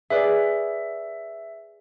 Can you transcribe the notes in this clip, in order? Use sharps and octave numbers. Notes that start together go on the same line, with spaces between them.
G#4 B4 D5 E5